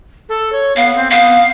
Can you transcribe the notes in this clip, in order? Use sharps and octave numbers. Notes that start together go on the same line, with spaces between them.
A4
C#5
B3 F5
C4
B3 F5